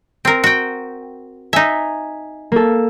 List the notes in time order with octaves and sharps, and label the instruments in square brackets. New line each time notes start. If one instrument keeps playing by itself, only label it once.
[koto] C4 A#4
F#4 G5
[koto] D#4 E5 [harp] G#5 B6
[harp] A#3 A4